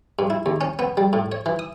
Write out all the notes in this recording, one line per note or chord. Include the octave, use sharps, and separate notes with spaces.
G2
E4
D#2
C#4
B3
G3
A2
C#5
E3
D#6